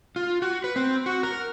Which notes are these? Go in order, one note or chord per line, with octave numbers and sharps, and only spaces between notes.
F4
F#4
B4
C4
F#4
A#4